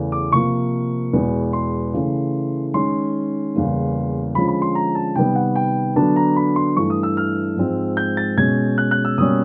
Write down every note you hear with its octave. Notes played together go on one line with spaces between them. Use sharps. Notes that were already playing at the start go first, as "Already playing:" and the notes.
Already playing: E2 C#3 E3 A3
D6
C3 F3 A#3 C#6
E2 B2 G#3 B3
C6
C#3 E3 A3 C#4
D#3 G#3 C#4 C6
E2 C#3 E3 G3 A#3
D3 F3 G#3 C#4 B5
B5
C6
A#5
A5
C3 D#3 G3 B3 G5
F#5
G5
D3 F#3 B3 D4 A5
A#5
B5
C6
G2 E3 A3 D4 C#6
D#6
E6
F6
G#2 F3 G#3 C4
G6
A6
B2 G#3 C#4 G#6
F#6
F#6
E6
B2 G3 A#3 C#4 D#6